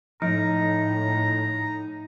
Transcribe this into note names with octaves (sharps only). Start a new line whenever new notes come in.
A2 F3 D#4 A#5